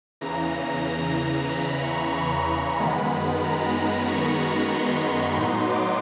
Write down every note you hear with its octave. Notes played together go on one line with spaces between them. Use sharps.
E2 C#3 E3 A#5
B5
C#6
C#6
F#2 D#3 G#3 B3 B5
A#5
A#5
C#6
C6
C#6
A2 F#3 B3 D#4 C6
D6